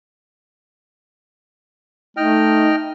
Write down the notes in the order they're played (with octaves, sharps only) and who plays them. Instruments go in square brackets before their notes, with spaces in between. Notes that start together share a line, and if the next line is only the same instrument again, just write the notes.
[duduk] A3 [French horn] D#4 [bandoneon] D#5 G5 F6